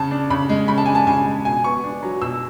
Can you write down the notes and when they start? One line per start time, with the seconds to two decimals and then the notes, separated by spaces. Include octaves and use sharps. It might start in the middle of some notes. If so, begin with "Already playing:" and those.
Already playing: C#3 A5
0.11 D4
0.30 C#3 B5
0.49 G#3
0.68 C#3 B5
0.78 A5
0.86 D4 G#5
0.95 A5
1.07 C#3 G#5
1.26 G#3
1.45 B2 G#5
1.64 B3 C#6
1.84 D4
2.03 F#3
2.22 B2 E6